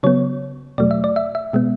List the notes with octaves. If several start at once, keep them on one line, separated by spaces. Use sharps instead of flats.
C#3 F#3 B3 C#5
E2 B2 F#3 A3 D5
E5
D5
E5
E5
B2 G#3 B3